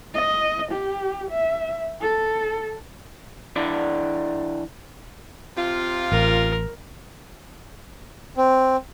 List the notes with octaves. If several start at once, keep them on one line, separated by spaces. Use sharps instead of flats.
D#5
G4
E5
A4
E3 D4 D5
C3 F4
A1 A#4
C4